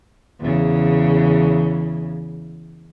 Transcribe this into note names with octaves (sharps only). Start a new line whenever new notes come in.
E2 C#3